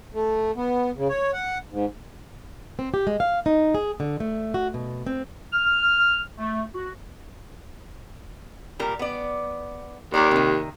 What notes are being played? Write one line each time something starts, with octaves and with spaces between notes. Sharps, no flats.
A3
B3
C#3
C#5
F#5
G#2
C4
G4
G#3
F5
D#4
G#4
D3
A3
F#4
B2
C4
F6
A3
F#4
A#2 G3 A#4
B3 D5
D#2 G4 A#4 D5
C3 D#3